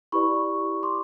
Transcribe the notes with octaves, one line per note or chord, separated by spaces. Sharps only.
E4 G4 B4 D5 B5 C#6
C6 D6